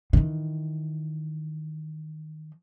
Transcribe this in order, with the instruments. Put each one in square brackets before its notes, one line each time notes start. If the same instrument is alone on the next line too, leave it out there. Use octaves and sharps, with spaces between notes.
[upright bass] D#3 E3